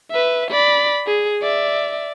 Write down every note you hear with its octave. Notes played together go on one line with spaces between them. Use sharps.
B4 E5
D5 B5
G#4
D5 E5